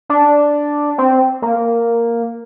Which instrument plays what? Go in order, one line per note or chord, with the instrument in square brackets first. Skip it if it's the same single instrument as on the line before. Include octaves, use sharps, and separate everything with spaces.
[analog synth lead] D4
C4
A#3